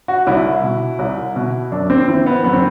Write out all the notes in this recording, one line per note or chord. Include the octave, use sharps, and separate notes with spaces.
F#4
C2 E4
B2
C2
B2
F#2 D4
C4
E3 C4
B3
F#2 B3
C4